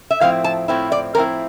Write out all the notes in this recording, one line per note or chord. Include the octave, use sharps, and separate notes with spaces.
E5
A2 F3 C4 E4 F5
A5
A2 F3 C4 E4
D5
A2 F3 C4 E4 A#4